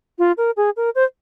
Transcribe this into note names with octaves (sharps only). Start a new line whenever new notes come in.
F4
A#4
G#4
A#4
C5